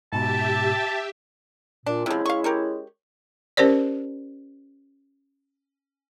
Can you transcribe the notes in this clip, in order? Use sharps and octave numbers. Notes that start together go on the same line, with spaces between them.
G#2 B2 G4 E5 A5
A#2 D4
C3 F3 G#3 C#4 E4
F5 C#6
G4 A#4 C#5
C#4 G4 A#4 C5 D5